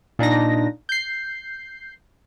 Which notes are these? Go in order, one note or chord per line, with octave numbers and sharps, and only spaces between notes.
A#2 D4 D#4 A#6
G6 C7